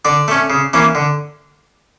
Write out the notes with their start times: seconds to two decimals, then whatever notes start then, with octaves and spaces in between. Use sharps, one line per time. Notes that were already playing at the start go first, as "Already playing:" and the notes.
0.05 D3 D5
0.28 A3 C#4
0.50 C#3
0.73 E3 A#3 C#4
0.95 D3